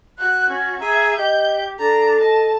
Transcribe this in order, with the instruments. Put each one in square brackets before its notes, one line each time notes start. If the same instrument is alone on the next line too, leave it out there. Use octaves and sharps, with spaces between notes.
[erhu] F#4 [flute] F#6
[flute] C#4
[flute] G#4 [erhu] E5 [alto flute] A#5
[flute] G4 [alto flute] D#5 [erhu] G6
[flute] D4 [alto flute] A4 [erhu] A#5
[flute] D#5 [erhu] A5